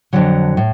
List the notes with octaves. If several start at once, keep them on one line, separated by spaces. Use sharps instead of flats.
F2 D3 F#3
A2